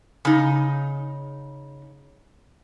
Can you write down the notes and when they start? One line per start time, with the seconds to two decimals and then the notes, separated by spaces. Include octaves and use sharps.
0.25 C#3 D#4